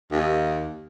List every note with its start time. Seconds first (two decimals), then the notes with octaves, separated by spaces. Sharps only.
0.11 D#2